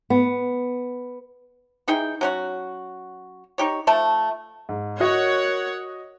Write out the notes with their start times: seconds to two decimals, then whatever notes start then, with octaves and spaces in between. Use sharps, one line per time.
0.10 B3
1.88 E3 D#4 G#4 G5
2.21 F#3 C#4 F#4
3.58 D#4 G4 C#5
3.87 F3 A3 A5
4.69 G#2
5.00 F#4 A#4 C#5 D#5 F#5